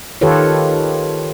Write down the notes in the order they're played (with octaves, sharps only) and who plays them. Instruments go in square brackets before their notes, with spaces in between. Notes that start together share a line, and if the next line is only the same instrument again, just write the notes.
[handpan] D#3 F4 G4 A4 B4 C#5